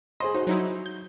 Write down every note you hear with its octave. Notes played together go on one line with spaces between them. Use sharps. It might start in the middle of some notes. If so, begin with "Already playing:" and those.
G#4 C5 D#5 C6
D#4 F#4 C5
F#3 D#4 E4
G6